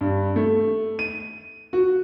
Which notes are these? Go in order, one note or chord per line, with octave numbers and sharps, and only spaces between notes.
G2
A3
D#7
F#4